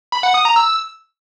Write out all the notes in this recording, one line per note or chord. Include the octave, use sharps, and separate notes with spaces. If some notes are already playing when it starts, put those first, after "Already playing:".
B5
F#5
D#6
A#5
E6